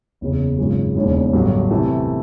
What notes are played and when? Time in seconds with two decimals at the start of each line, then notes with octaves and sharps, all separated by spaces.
0.21 F#1 E2 C#3
0.58 G#1 F#2 C#3 F3 G#3
0.95 E1 D#2 C#3 E3 G#3
1.32 A1 G2 D3 F#3
1.71 C3 E3 A3